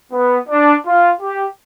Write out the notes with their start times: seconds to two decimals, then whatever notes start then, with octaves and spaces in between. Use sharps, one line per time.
0.13 B3
0.49 D4
0.85 F4
1.21 G4